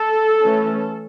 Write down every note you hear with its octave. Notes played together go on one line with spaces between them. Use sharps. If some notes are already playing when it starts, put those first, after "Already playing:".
Already playing: A4
E3 A3 C#4